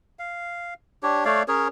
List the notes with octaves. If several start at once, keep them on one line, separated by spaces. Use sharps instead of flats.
F5
D4 G4 C#5
A3 C#5 D5 F5
C#4 G#4 A#4 C#5